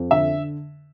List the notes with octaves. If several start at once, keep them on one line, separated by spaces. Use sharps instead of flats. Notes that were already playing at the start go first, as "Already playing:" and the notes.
Already playing: F2
D3 E5